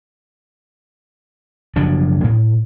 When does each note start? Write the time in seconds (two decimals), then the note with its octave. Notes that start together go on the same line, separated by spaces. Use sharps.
1.76 F#1 F3 F#3 D4
2.24 A2